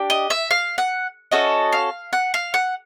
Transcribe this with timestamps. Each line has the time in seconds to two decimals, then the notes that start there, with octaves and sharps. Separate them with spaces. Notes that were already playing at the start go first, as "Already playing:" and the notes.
Already playing: D4 G4
0.10 D#5
0.30 E5
0.51 F5
0.78 F#5
1.31 C#4 F#4 A4 D#5
1.72 F5
2.13 F#5
2.34 F5
2.54 F#5